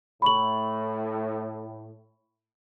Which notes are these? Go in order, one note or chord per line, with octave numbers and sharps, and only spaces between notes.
A2 B5 C#6 F#7